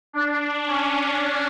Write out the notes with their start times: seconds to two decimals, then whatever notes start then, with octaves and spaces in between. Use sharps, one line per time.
0.13 D4
0.67 C#4